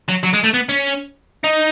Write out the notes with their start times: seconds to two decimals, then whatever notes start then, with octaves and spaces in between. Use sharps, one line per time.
0.09 F#3
0.24 F#3
0.33 G#3
0.44 A3
0.54 B3
0.69 C#4
1.44 D#4